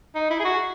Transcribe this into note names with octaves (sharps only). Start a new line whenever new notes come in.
D#4
E4
G#4
F#4